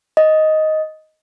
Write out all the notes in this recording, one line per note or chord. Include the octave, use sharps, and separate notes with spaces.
D#5